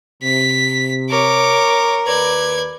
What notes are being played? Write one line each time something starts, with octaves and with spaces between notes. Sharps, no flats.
C3 B6
A#4 C#5 D6
D#2 B4 D5 G#6